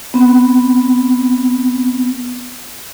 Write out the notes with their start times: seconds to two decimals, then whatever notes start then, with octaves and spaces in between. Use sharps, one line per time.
0.14 B3 C4